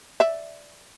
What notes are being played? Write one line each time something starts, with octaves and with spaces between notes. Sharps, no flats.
D5 E5